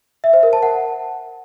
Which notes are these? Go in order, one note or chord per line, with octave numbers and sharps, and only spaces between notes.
E5
C5
A#4
A5
F#5